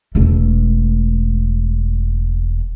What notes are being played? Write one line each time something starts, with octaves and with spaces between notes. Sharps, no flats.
E1 A3